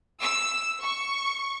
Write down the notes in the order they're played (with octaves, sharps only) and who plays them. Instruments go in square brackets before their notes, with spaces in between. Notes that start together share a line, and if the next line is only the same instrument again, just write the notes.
[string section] E6
C#6